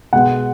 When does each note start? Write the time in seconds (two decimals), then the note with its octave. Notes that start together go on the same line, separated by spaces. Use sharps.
0.13 B2 G#3 B3 F#5